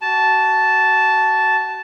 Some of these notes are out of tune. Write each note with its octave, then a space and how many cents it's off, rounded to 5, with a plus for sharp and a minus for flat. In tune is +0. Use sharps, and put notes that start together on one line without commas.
F#4 +25 A5 -5